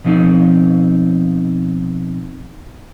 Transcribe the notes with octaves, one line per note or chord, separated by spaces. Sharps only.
B2 F3 C4 D#4